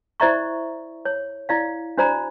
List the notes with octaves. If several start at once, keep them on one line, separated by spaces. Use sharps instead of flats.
E4 C5 D5 E5 A#5 C#6
C#5
E4 D5 F5
D4 F#4 C5 D5 A#5 B5